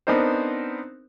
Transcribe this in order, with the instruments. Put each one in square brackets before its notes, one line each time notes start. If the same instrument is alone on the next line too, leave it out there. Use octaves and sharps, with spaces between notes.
[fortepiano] B3 C4 D4 D#4 A#4 C5